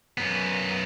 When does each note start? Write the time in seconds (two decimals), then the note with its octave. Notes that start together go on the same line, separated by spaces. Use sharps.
0.18 F#2 B3